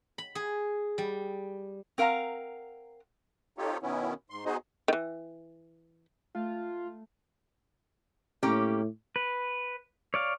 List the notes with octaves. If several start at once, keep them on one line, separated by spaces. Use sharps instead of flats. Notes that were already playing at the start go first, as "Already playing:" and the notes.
B5
G#4
G3
C4 A#4 F5 F#5 A#5
C4 D#4 F4 G4 A4 C#5
B2 D#3 B3 C#4 E4
G#2 C6
B3 D#4 F#4 G#4 C5 D#5
D#3 E3
A3 F4
A2 A#3 C#4 G4
B4
C#5 D5 F5